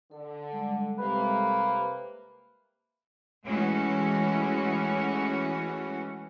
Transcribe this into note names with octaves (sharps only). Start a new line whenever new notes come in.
D3 A4
G3 G#3 A4
C3 A#3 B4
E3 G#3 A3 C#4 F#4